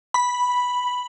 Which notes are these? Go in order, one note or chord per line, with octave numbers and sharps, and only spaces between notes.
B5